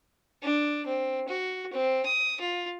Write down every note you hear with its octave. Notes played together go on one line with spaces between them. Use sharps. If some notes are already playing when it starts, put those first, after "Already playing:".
D4
C4
F#4
C4
D#6
F4